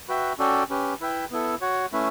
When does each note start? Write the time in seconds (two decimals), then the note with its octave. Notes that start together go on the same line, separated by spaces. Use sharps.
0.09 F#4 B4 E5 G5
0.39 C#4 F#4 A4 D5 G5
0.70 C#4 G4 B4
1.01 E4 B4 E5 G5
1.31 B3 E4 A4
1.61 F#4 C#5 F#5
1.92 A3 C#4 E4 B4 E5